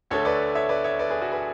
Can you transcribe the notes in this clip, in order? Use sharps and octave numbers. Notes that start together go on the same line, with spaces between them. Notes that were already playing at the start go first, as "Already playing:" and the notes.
D2 D3 A3 A4 C#5
B4 D5
C#5 E5
B4 D5
C#5 E5
B4 D5
G#4 B4
F#4 A4
G#4 B4